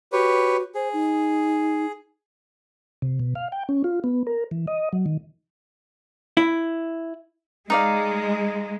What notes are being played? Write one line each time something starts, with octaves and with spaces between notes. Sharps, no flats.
F#4 G4 B4 C#5
G#4 C5
D#4
C3
B2
F5
G5
C#4
F4
B3
A#4
E3
D#5
F#3
D#3
E4
G#3 D#4 D5 F5